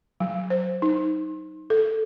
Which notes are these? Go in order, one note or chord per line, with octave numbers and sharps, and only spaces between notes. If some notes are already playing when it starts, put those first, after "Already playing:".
F#3
C5
D#4
A4